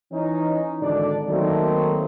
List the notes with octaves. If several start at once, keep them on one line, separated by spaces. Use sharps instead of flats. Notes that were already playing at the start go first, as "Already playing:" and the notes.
E3 C#4 D#4
G#1 D3 D4 D5
D#3 F#3 A3 A#3 C4 D#4